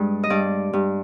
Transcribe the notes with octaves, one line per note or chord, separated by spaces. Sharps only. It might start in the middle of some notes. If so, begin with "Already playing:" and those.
Already playing: G2 G#3 D5
D#5
G2 D5
G2